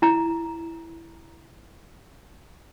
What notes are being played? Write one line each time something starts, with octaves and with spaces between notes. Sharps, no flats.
E4 A#5